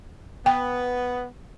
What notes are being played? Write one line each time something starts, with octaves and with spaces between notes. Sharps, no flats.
B3 G5